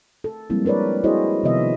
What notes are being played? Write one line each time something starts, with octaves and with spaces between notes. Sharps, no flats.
A4
F3 G3 G#3 A#3 C4 E4
D4 A#4 B4 C#5 D5
E4 F#4 G#4 C5 C#5 D#5
C3 D#3 F3 B3 D#5 E5